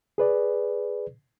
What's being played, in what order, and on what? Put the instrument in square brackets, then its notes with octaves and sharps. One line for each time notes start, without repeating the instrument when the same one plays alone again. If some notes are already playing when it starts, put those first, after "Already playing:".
[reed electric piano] G#4 B4 D5